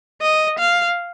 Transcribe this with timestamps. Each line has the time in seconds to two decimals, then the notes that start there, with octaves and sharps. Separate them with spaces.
0.22 D#5
0.59 F5